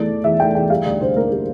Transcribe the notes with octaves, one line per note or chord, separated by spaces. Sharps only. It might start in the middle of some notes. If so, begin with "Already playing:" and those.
Already playing: E2 A3 D5
E3
E2 E5
A3 G5
E2 G5
G3 F5
D2 D5
D3 C5
A#3 A#4
G3